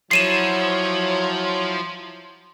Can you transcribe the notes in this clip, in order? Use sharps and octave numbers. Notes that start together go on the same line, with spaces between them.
F3 F#3 E4 C#5 C7 D#7 E7